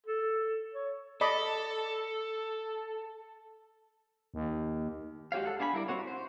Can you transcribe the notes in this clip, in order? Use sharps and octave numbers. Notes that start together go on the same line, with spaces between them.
A4
C#5
A4 D5 D#5 B5
D#2
G#3 F#4 G4 C#5 F5
A4 F#5
B3 D4 F5 G#5 B5
G3 E4 A#4 D5
C4 F#4 C#5
C5